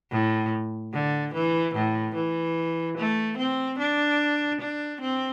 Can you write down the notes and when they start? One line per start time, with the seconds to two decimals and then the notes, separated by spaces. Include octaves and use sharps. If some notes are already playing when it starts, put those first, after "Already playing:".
0.12 A2
0.93 D3
1.34 E3
1.75 A2
2.15 E3
2.97 A3
3.38 C4
3.79 D4
4.61 D4
5.01 C4